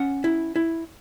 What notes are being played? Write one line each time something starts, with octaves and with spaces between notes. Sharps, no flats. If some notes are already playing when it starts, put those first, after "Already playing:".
Already playing: C#4 F#5
E4
E4